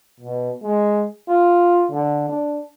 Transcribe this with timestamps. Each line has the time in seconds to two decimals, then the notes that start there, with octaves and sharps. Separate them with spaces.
0.20 B2
0.63 G#3
1.28 F4
1.90 D3
2.29 D4